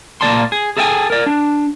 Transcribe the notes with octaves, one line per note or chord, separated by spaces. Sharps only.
A#2 A#3 A#4 D5 A5 C6
G#4
G#4 A4 D#5 E5 G5 G#5
A#4 D5
D4